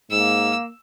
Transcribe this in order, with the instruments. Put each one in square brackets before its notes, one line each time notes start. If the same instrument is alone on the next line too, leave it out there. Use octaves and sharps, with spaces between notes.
[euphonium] G#2 [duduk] A#3 [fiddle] E6